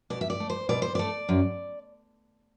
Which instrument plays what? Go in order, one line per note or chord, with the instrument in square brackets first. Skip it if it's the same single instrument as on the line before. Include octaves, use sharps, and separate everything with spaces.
[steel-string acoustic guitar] B2 D5
E5
D5
A3
C5
B2 D5
C5
A3 D5
F#2